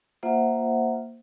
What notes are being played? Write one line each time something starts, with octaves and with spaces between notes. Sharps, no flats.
A#3 F4 C5 E5 F#5